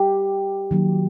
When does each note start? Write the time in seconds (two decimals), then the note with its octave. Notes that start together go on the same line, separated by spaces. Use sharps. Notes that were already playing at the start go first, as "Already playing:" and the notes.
Already playing: G4
0.71 D#3 F#3 A#3